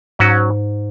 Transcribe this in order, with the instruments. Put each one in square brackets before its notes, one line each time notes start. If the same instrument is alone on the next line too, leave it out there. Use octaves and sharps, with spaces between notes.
[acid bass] G#2 [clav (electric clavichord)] F#3 C#4 F#4